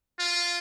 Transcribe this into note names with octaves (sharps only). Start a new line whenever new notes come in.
F4